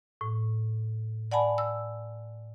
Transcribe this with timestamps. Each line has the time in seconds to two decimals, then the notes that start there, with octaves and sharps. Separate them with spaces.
0.21 A2
1.32 D5 F#5 G#5 A5 B5
1.58 E6